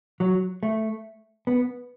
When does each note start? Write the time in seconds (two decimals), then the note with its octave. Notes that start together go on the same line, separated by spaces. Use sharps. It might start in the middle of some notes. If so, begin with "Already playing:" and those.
0.20 F#3
0.63 A3
1.47 B3